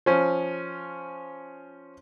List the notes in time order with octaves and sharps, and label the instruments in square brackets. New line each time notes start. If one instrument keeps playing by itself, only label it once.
[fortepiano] F3 C#4